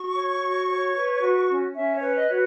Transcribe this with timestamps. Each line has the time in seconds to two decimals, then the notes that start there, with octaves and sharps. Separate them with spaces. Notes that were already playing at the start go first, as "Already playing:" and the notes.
Already playing: F#4 C#6
0.15 C#5
0.42 F#4
0.69 C#5
0.95 B4
1.22 F#4
1.49 C#4
1.75 C#4 E5
1.95 C#5
2.03 B4
2.16 D#5
2.29 F#4 C#5